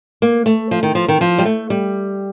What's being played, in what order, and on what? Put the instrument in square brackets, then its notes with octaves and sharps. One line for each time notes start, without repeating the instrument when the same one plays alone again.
[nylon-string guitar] A#3
A3
F3
D#3
F3
D#3
F3
G3
A3
G3